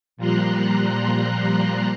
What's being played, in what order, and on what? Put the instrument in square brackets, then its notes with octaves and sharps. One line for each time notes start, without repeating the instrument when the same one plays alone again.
[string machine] A#2 F3 G3 A#5 C6 F#6